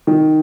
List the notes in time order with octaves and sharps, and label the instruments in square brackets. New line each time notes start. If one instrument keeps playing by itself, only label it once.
[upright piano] D#3